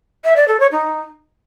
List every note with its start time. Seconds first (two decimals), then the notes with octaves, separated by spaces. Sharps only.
0.25 E5
0.36 D5
0.48 A4
0.60 C#5
0.72 D#4